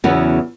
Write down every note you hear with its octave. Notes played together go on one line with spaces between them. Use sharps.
E2 C#3 F#3 B3 E4